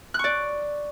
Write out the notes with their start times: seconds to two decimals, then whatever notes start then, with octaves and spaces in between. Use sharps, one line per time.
0.14 F#6
0.19 C#6
0.24 D5